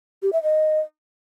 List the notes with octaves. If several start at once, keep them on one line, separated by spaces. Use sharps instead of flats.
G4
E5
D#5